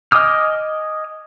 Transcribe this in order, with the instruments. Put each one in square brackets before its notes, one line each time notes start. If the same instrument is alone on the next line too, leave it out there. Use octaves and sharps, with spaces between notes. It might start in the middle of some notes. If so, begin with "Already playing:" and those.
[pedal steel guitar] D#5 G#5 D6 D#6 F6